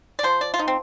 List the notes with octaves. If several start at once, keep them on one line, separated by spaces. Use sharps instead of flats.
D5
F3 C5
D5
F4
F3 D#4
C4